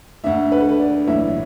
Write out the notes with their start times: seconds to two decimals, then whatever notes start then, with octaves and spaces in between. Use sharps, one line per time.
0.24 D2 D3 E5
0.52 B4
0.60 A4
0.69 B4
0.79 D5
1.07 B1 A2 E3 E5